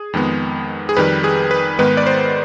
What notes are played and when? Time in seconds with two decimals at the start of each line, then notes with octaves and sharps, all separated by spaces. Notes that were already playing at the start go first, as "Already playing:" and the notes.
Already playing: G#4
0.13 F2 D#3 G#3 B3
0.89 G#4
0.97 F2 D#3 G3 B4
1.24 G#4
1.51 B4
1.79 G#2 D#3 G#3 B3 B4
1.97 D5
2.06 C5